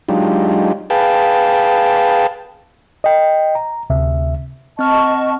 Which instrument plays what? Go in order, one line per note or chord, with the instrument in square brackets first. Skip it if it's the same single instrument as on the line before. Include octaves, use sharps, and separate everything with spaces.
[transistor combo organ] F#3 G#3 D4 D#4 F4 G4
G#4 B4 F5 G5 A5
[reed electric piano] D#5 G5
A#5
D2 C3 E5
[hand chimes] C4 F6 [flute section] D#5 A5 C#6